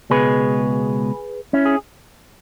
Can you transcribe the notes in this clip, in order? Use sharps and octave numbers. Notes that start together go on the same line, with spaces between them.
C#2 B2 G#3 B3 G#4 B4
C#4 E4
G#4